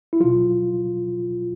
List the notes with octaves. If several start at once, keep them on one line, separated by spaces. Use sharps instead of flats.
E4
B2 F#3 F4